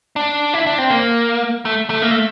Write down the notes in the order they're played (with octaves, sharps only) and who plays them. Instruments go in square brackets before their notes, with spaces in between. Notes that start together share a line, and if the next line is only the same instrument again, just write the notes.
[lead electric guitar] D4
E4
D4
C4
A#3
A3
A3
A#3
A3